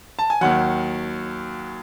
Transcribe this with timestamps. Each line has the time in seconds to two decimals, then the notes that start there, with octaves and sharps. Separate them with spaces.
0.19 A5
0.30 G#5
0.41 D#2 D#3 F#3 F#5